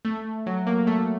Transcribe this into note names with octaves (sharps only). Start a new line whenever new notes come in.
A3
F#3
A#3
A3